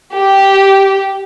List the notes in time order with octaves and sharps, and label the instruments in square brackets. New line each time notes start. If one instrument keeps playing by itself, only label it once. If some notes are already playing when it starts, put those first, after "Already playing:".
[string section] G4